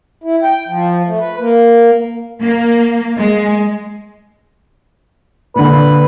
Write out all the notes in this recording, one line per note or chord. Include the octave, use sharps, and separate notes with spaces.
E4
G5
F3
A3
B4
A#3
A#3
G#3
A#2 D3 B4